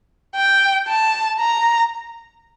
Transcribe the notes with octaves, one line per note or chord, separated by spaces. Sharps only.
G5
A5
A#5